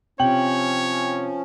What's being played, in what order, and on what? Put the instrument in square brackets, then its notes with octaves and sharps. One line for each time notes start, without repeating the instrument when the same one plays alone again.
[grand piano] C3 F#7 [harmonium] F3 C#4 [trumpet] C#5 [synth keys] G5